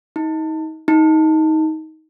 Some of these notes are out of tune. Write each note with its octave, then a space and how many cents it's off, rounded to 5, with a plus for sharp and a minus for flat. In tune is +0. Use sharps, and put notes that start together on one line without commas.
D#4 +30
D#4 +20